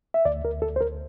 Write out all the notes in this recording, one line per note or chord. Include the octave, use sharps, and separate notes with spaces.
E5
D2 D5
D2 A#4
D2 A4
C5
D2 A#4